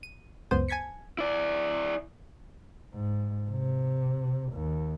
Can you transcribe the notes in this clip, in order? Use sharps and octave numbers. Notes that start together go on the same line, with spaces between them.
D#7
C#2 F#2 B3 C5 D#7
G#5 A5 G#6 B6 C#7
E4 D5
G#2
C3
D#2